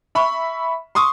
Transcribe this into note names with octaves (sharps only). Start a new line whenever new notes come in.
E5 B5 C#6
C6 C#6 D#6